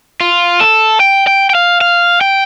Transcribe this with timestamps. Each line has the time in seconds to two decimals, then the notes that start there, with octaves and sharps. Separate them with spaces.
0.21 F4
0.60 A4
1.00 G5
1.27 G5
1.50 G5
1.55 F5
1.81 F5
2.21 G5